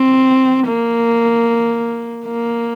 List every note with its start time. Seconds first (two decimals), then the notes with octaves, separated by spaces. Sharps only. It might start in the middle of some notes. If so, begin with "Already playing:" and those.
Already playing: C4
0.67 A#3
2.25 A#3